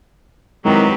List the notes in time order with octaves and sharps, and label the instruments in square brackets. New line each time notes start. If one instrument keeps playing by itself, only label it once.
[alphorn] D#3 [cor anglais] F#3 [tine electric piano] G#3 E4 [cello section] C4 G4 B4